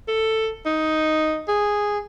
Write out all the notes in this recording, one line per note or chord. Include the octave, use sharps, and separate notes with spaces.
A4
D#4
G#4